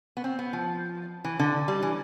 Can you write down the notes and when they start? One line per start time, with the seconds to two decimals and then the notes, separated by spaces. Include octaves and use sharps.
0.17 B3
0.24 C4
0.39 B3
0.53 F3
1.24 E3
1.39 D3
1.68 G3
1.82 E3